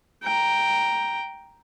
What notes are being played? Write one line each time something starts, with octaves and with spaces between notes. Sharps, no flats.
G5 A#5